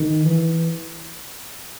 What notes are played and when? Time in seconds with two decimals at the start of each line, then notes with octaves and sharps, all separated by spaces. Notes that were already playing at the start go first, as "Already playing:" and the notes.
Already playing: D#3
0.25 E3